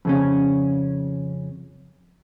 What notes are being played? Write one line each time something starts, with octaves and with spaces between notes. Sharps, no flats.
F2 C#3 C#4